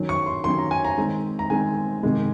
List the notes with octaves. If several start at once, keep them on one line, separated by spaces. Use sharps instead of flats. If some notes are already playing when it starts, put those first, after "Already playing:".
Already playing: D#3 F#3 C#4
C#6
C6
D#3 F#3 C#4 C6
A#5
G#5
A#5
D#3 G#3 C4
A#5
D#3 G#3 C4 G#5
C3 D#3 G#3